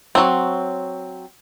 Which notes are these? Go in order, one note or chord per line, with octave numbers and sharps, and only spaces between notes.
F#3 C4